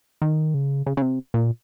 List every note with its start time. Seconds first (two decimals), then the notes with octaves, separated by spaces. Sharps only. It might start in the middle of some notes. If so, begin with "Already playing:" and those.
0.22 D#3
0.54 C#3
0.86 C#3
0.97 C#3
1.02 C3
1.34 A#2